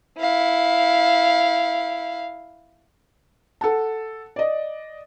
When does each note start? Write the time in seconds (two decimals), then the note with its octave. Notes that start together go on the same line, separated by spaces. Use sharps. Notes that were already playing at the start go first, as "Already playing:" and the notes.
0.19 E4 F5
3.61 A4 F#5 A5
4.36 D5 D#5